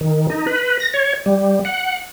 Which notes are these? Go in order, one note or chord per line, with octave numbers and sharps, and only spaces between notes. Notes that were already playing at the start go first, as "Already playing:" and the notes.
D#3
D#4
B4
A#6
C#5
G3
F#5